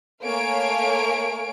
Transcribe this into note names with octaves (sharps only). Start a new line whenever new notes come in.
A3 A#3 C#5 F5 G#5 D7